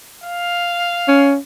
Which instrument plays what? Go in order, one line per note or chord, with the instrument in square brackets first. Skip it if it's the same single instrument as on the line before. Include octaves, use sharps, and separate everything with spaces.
[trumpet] F5
[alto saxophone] C#4